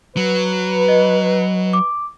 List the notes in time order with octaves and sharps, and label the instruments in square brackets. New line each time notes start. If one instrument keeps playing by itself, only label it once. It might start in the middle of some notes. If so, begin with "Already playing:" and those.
[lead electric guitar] F#3 [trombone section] B4
[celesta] D#5
D6